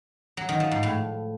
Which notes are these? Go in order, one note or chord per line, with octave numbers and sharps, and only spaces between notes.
F#3
D#3
F3
G#2
A2